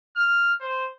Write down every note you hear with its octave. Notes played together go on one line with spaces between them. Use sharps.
F6
C5